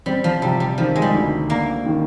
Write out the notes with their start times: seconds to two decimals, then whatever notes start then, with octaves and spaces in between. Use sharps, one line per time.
0.06 G3 C4
0.24 F3
0.42 C3 G3
0.60 G3
0.78 D#3 F3
0.96 G#3
1.02 G3
1.14 D2
1.50 A#3 D4
1.86 D#3